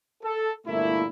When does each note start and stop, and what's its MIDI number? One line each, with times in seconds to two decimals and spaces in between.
0.23 0.52 69
0.66 1.05 31
0.66 1.05 46
0.66 1.05 57
0.66 1.05 58
0.66 1.05 64